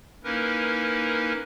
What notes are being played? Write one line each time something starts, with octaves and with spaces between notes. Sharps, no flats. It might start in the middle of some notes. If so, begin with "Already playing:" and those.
A#3 C#4 D#4 E4 A#4 B4